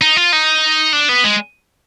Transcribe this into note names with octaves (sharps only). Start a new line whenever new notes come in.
D#4
F4
D#4
D4
B3
G#3